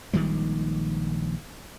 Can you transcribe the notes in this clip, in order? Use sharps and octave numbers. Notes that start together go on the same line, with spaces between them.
A#1 D#3 G3 G#3